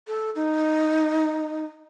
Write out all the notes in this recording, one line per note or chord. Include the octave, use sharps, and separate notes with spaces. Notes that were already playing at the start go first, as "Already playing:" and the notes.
A4
D#4